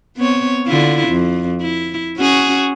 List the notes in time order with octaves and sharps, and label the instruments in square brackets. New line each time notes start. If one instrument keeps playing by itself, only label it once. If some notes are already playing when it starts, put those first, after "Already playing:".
[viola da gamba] B3 C4 C#5
D3 E4 F4
F2
E4
C#4 F#4 G#4